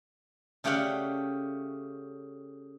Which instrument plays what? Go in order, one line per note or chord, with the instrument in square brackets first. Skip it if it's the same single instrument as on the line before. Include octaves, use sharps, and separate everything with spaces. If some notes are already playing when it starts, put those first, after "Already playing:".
[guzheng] C#3 A3 G4 D5 F5 F#5